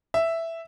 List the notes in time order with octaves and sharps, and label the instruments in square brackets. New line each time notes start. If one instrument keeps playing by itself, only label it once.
[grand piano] E5